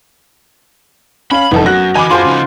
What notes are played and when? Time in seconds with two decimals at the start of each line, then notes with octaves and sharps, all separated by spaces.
1.31 C#4 F5 B5 F#7
1.52 F1 F#2 E3 B3 D#4 A4
1.66 F#4 F#6 A#6
1.95 E3 D#4 G#5 B5 D6
2.10 F#2 G#3 F4 C5 A5
2.26 C#3 D#4